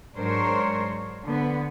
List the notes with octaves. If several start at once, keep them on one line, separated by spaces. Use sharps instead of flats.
G#2 F#3 D4 A#4 C5 C#5
D3 B3